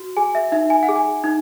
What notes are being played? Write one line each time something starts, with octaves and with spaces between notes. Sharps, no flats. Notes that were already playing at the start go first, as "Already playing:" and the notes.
Already playing: F#4
G#4 G#5
E5
D#4 E5
G#5
F#5
G#4
G#5
D#4